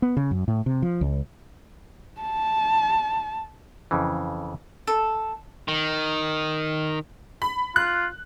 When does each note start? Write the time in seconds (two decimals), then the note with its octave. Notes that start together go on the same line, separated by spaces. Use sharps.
0.02 B3
0.17 C#3
0.31 F#2
0.48 A2
0.66 C3
0.82 F3
1.01 C#2
2.21 A5
3.91 F2 C#3 E3
4.87 A4
5.68 D#3
7.42 B5
7.76 F4 F#6